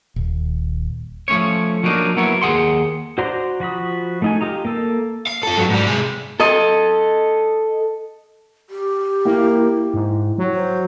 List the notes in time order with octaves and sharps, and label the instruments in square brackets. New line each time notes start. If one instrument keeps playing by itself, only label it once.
[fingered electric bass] D#1
[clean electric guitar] F3 A3 C#4 C#5
F3 F#3 A#3 D4 D#4
F#3 A#3 B3 E4 C#5
D#2 G#4 F#5 C6
[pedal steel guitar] F#4 C5 D5 A#5 C6
F3 F#4 B5 D#6
A3 D#4 G#5
F4 G4 D#5 A#5
A#3 A4
[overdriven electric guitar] F5
F4 A4
G2 F#3
G#2 G3
C3 G#3
[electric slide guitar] A4 D#5
[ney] G4
[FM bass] A#3 [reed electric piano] E4 G5
[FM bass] G#2
F#3
[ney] C5